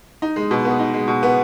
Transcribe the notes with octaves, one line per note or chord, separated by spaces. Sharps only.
D#4
G#3
B2
B3
D#4
G#3
B2
B3